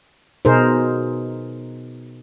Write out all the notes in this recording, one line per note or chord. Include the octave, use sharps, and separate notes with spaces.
B2 D#4 G#4 A#4 C5